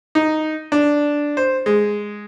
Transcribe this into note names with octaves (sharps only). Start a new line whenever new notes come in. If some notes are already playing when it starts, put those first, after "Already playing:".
D#4
D4
C5
G#3